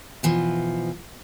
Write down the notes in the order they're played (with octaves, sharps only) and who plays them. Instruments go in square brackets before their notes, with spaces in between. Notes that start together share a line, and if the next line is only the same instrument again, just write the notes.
[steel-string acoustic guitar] B2 E3 F3